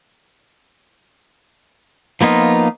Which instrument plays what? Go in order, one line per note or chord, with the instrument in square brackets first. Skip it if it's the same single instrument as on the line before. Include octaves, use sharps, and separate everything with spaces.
[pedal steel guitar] F3 A#3 B3 D#4 F4